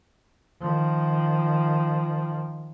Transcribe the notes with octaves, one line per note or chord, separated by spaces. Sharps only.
D#3 F3